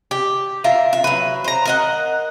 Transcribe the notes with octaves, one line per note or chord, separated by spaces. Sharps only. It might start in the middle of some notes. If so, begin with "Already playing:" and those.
G4
F4 A#4 E5
E5
F#3 B4
C5 A#5
A#4 D#5 F#5